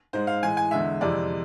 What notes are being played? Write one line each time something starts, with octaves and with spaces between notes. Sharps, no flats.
G#2 G#3 C5
F5
A2 E3 G#3 G#5
G#5
E2 D3 G#3 E5
F2 C3 E3 G#3 D5